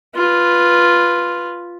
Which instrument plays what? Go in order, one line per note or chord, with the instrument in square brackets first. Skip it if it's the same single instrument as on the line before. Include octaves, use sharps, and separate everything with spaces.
[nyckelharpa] F4 B4